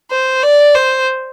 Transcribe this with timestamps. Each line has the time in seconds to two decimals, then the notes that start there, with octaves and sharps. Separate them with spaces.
0.10 C5
0.43 D5
0.75 C5